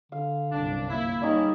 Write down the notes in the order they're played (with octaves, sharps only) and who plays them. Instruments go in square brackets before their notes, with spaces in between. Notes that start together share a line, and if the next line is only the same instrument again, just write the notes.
[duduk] D3 [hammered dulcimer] F5
[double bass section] G1 C2 F#2 [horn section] D4
[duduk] A#3 [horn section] E4
[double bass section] C#2 G3 [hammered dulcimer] D#3 D#4 D5 [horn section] C#4 E4